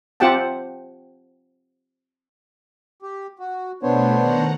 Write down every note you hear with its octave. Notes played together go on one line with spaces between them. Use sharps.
C4 F4 G4 F#5 G5 A5
G4
F#4
B2 A3 B3 D4 C5 C#5
D#3 F#5 A#5